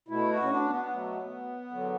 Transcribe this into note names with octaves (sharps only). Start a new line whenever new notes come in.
B2 A3 E4
F#4
C#4
D4
B3
B2 F#3 A3
E2 D3 F#3